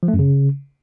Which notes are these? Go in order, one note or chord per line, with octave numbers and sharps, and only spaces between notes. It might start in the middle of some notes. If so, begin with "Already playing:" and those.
F3
A3
F#2
C#3